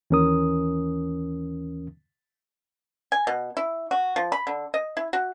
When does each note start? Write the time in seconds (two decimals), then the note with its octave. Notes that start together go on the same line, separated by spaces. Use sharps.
0.10 D#2 E3 C#4 A#4 D#6
3.12 G#5
3.27 B2
3.57 E4
3.91 F#4
4.16 F3
4.32 B5
4.47 D3
4.74 D#5
4.97 E4
5.13 F#4